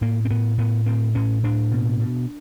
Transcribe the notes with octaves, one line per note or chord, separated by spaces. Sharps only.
A2 A#3
C4
A2 B3
A2 B3
A2 C4
A2 C#4
A2 D4
B2
B2